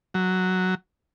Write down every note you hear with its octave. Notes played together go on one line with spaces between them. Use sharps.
F#3